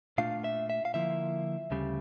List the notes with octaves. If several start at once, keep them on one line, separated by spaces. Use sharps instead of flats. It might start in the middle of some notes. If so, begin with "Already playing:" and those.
A#2 A3 D4 F4 F5
E5
E5
F5
D3 F3 A#3 E4 E5
D2 C#3 G3